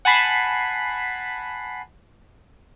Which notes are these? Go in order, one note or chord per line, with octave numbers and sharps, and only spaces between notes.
F#5 G#5 A5 B5 B6 C7